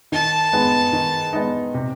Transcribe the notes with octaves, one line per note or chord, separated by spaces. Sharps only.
D#3 A5
G#3 B3 D#4
D#3
G#3 B3 D#4
C3